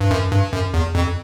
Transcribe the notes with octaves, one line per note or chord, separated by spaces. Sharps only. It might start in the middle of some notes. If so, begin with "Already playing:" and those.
G2
F#2
G2
F#2
E2
F2